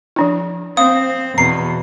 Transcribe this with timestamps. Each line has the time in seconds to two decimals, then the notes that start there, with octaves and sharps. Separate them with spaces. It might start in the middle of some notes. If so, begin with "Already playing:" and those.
0.16 F3 D4 E4
0.77 C4 F5 D#6
1.38 E2 B2 A#5 C7